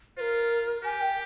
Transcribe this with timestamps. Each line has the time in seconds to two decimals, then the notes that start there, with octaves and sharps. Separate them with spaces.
0.17 F4 A#4 C5
0.84 G4 G#5
1.01 G5